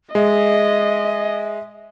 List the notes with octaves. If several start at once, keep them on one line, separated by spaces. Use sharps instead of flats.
G#3 D#5 E5